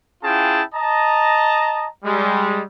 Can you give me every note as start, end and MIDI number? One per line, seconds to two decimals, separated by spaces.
0.24 0.62 61
0.24 0.62 64
0.24 0.62 65
0.24 0.62 68
0.24 0.62 79
0.24 0.62 81
0.75 1.88 75
0.75 1.88 81
0.75 1.88 82
2.05 2.61 55
2.05 2.61 56